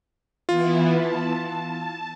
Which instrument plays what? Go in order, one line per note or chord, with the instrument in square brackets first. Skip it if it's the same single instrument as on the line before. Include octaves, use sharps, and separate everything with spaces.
[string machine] E3 B3 E4 [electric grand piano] F4
[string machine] A5